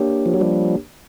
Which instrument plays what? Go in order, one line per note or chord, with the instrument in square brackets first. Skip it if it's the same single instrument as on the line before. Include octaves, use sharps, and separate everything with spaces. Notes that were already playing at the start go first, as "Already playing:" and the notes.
Already playing: [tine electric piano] A#3 D4 G4 A#4 C#5
[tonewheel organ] F3
F#3
F3 G3